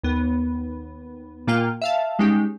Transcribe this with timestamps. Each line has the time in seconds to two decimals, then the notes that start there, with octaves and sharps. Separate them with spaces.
0.03 D#2 B3
1.47 A#2 A#3 F4 G5 F6
1.82 E5 F5 A5
2.19 G3 G#3 C#4 D#4 G4